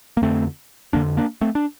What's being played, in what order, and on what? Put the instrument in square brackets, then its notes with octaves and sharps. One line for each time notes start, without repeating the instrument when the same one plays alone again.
[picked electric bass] A#3
F2 D3 A3 C4
F2 D3 A#3 D4
A#3 D4
A3 C4
D4